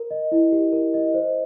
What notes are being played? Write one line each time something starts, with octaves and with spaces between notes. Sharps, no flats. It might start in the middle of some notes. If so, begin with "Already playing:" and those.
Already playing: A#4
D#5
E4
G4
A#4
D#5
C5